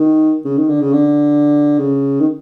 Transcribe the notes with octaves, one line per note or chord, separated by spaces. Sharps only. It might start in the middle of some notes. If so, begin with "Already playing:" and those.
Already playing: D#3
C#3
D#3
D3
C#3
D3
C#3
D#3